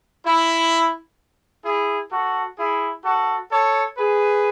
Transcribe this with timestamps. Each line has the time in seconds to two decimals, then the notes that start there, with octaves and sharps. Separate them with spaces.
0.25 E4
1.65 E4 G#4
2.12 F#4 A4
2.58 E4 G#4
3.04 F#4 A4
3.50 A4 C#5
3.98 G#4 B4